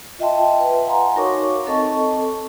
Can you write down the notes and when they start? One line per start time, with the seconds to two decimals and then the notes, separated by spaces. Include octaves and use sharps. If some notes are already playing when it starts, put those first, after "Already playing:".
0.19 F4 D#5 E5 G5 A5 C6
0.60 B4
0.85 F5 F#5 G#5 A#5 C6
1.15 D#4 F#4 A#4 C#5 C#6 D6
1.67 C4 A4 D#5 A5 C#6